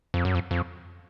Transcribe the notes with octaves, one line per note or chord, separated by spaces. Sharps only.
F2
F#2
F2
F2